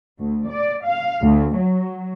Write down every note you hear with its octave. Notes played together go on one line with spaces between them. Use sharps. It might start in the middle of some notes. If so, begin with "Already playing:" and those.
D2
D5
F5
D2
F#3